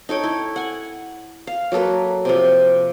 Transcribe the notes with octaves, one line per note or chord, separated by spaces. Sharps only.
D#4 A4 C#5 G5
E4
F#5 G#5
F5
F#3 A#3 A4 B4
C3 F3